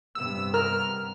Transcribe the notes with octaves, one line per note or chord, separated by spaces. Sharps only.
G2 C3 B3 E6
A#4 F6